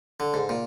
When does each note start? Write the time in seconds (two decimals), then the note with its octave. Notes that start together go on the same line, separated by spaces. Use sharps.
0.20 D3
0.34 G#2
0.49 A#2